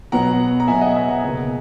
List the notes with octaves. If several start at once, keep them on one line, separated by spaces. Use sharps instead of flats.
B2 F#3 B3 F#5 A#5
A#5
B2 F#3 B3 E5 G#5
D#5 F#5
E5 G#5
F#5 A#5
C#2 B2 A#3